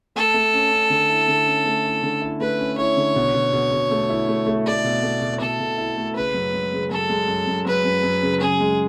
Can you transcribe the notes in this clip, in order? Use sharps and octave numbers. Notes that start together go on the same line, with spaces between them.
A3 A4
A3
C#4
C#4
D3
E4
D3
C#4
A3
E4
D3
E4
A3 B4
C#4
E4 C#5
D3
B2
B2
B2
B2
A3
E4
A3
A3
A3 D5
B2
A3
B2
B2 A4
B2
E4
A3
C#3 B4
F#2
G#3
C#3
F#2 A4
G#3
F#2
F#2
F#2 B4
F#2
F#2
C#3
C#3 G#4
G#3